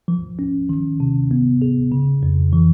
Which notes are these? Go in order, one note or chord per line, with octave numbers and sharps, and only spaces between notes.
F3
C#4
D#3
C3
B3
G#4
C#3
F2
E3